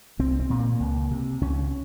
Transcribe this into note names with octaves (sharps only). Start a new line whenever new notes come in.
C2 C4
C4
A#2
A#3
C#2
C3
C#2 C#4